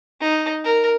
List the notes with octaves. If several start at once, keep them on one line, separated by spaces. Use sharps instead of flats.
D#4
A#4